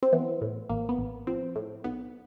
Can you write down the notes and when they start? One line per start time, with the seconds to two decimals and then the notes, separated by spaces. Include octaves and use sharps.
0.03 C4
0.13 E3 B3
0.41 A2
0.69 A1 A#3
0.89 B3
0.98 A1
1.27 F3 C4
1.56 A2
1.84 B1 B3